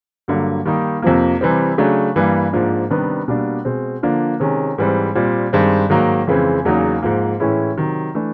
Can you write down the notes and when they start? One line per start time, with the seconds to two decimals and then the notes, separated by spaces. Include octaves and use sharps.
0.28 G2 D3 F#3 A#3
0.65 D#3 G3 A#3 D#4
1.02 F2 C3 F3 A#3
1.41 C3 E3 G3 C4
1.78 C#3 F#3 A3 D4
2.16 G2 E3 G3 A#3
2.53 G#2 F3 A#3 D4
2.90 C3 D#3 G3 B3 D4
3.28 B2 G3 A#3 D4
3.65 B2 G#3 C4
4.03 D3 F3 A#3 D4
4.40 C3 D#3 G#3 C#4
4.78 G#2 E3 G3 C4
5.15 A#2 G3 C4
5.53 G2 D#3 G#3 C4
5.90 G#2 D#3 F#3 A#3
6.27 F2 C#3 E3 G#3 C4
6.65 E2 C#3 F#3 A#3 D#4
7.03 G#2 F3 A#3
7.40 A2 E3 G#3 C#4 E4
7.77 C3 D#3 F#3
8.15 E3 A3 D4